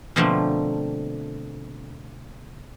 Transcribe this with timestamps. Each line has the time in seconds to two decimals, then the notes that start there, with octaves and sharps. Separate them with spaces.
0.16 B2 D3 F3 A3 A#3 C4